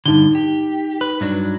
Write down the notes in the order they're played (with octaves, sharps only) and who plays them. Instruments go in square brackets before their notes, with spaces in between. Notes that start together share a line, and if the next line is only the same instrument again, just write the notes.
[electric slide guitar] G2 D3 [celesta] D#4 G7
[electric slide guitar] G4
B4
G2 F#3 D4